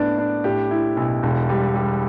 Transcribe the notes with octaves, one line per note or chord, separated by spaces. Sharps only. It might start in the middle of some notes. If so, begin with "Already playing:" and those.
Already playing: A2 B3 D4 D5
D4
A2 G4
E4
B1
E1
G3
G3